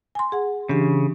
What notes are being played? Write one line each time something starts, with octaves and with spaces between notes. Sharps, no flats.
G#5 C6
G#4 F#5
C#3 E3 D4 G4